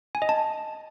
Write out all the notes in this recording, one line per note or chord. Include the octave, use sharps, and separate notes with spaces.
G#5
D#5
A5